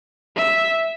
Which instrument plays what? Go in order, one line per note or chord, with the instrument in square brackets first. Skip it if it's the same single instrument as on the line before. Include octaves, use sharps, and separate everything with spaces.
[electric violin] E5